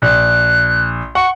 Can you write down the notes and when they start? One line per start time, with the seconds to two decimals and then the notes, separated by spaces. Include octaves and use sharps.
0.02 A#1 F#6
1.15 F#5 C#6